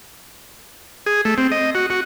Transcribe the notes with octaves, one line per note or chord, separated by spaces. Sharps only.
G#4
A3
C4
D#5
F#4
F#4